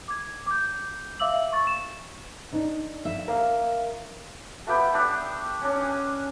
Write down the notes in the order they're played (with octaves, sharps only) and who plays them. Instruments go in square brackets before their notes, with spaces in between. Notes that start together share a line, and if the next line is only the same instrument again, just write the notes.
[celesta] D6 G#6
D6 G6
E5 F5 D6 E6 F#7
C#6 A6
E7
[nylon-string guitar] D4 D#4
[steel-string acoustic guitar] E5
[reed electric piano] A#4 F5
[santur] A3 B3 G4 G5
A3 D4 G4 A4
C#4 D4
G#5